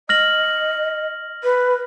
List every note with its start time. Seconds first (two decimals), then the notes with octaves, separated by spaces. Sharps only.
0.09 D#5 F6 A#6 F#7
1.43 B4